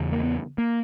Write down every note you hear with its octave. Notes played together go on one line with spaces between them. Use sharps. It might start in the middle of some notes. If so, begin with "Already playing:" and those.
Already playing: E2 C#3
A#3
B3
A#3